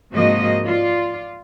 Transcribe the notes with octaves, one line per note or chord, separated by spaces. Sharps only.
G#2 C3 F3 A#3 F#4 D#5
F4 D5